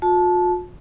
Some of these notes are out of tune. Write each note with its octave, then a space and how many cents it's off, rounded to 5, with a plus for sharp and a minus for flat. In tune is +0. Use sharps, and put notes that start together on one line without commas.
F4 +45 A5 -15